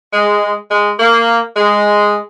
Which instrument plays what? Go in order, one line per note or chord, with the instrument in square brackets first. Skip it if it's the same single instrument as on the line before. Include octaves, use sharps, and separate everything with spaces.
[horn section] G#3
G#3
A#3
G#3